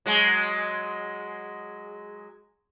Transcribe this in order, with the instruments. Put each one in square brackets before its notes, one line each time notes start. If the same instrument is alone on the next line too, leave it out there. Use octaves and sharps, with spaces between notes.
[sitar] F#3 G#3